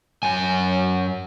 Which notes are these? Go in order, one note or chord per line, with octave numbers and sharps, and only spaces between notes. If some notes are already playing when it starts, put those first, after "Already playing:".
F#2 G#5